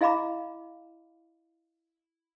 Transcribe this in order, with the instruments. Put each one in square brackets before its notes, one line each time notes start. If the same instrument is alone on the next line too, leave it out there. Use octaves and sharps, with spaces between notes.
[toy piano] E4 D#5 F5 A#5 B5 D6